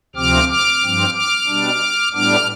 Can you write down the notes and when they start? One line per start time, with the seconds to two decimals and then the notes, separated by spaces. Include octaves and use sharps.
0.16 D2 C3 F3 C4 D6 F6
0.48 D6 F6
0.81 G2 F3 C4
1.14 D6 F6
1.47 B2 G3 D4
2.13 A2 G3 B3 D4 D6 F6